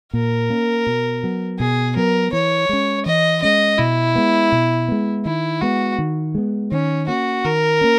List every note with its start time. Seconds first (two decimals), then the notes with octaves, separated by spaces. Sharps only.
0.13 A#2 A#4
0.50 A#3 C#4
0.87 B2
1.23 F#3 B3
1.59 B2 G#4
1.96 F#3 B3 A#4
2.33 E3 C#5
2.69 G#3 C#4
3.06 E3 D#5
3.42 G#3 C#4 D#5
3.79 B2 E4
4.15 G#3 B3
4.52 B2
4.88 G#3 B3
5.25 D#3 E4
5.61 G#3 B3 F#4
5.98 D#3
6.35 G#3 B3
6.71 D#3 C#4
7.08 A#3 C#4 F#4
7.44 D#3 A#4
7.81 A#3 C#4